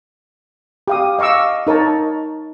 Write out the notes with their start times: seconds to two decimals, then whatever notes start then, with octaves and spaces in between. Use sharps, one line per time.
0.88 G4 F5 D#6
1.19 D#5 F5 C#6 D6 E6
1.67 D#4 A#4 C#5 A5